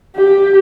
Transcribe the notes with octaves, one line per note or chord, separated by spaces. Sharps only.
G4